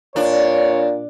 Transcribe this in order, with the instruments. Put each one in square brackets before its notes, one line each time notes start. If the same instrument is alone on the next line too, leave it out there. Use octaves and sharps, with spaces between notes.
[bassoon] A#2 [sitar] D4 [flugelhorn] C#5